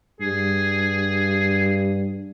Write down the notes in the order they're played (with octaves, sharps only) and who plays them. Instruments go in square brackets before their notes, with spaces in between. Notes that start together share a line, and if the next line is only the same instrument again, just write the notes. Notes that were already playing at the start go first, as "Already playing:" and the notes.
[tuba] G2 [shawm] G#4